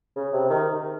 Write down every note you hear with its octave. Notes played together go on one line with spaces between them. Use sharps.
C#3
C3
D#3